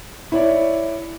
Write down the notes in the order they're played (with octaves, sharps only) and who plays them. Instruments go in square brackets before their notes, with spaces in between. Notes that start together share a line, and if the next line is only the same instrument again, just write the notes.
[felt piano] E4 C#5 D5